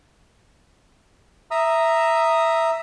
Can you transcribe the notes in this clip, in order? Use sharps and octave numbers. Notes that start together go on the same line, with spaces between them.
E5 A#5 D#6 E6